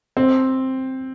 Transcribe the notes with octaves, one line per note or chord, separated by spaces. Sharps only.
C4